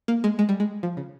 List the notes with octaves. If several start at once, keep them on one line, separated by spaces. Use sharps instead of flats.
A#3
G#3
G#3
G3
G#3
F3
C#3